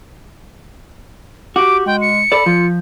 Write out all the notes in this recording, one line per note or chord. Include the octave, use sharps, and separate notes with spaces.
F#4 G4 D6
G#3 G5
C#7
A4 D5 B5
F3 F4